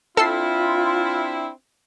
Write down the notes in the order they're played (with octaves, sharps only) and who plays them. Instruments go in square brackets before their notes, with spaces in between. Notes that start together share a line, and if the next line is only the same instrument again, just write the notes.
[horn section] C4 D4 E4 [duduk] F4 [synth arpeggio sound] A4 E6 C7